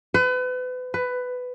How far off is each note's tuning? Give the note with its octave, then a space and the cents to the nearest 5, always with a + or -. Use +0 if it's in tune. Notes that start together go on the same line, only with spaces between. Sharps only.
B4 +35
B4 +15